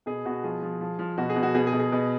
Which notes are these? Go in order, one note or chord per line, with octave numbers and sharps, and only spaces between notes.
B2 G#4
B2 F#4
F3 G#4
F3
F3
F3
B2 F#4
G#4
B2
F#4
B2 G#4
G#4
B2
G#4
B2